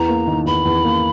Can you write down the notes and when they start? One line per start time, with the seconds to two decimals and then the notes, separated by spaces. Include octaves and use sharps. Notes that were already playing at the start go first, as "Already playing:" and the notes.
Already playing: E2 A#5
0.09 A#3
0.27 D#3
0.46 E2 B5
0.65 E2
0.85 A#3